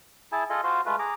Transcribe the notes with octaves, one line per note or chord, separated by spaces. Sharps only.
E4 G#4 G#5 A5
F4 G#4 A4 D#5
F4 F#4 C5 C6
G#3 A3 F4 B4
G#4 A#5 D6